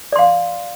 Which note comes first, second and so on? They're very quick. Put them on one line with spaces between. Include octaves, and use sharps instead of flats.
D5 C6 F5